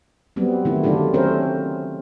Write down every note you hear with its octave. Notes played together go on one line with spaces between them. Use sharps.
F#3 G3 B3 C4
D#3 A3 E4
D3 F#3 A3 D4 F4 G4
A3 C4 C#4 A#4 C5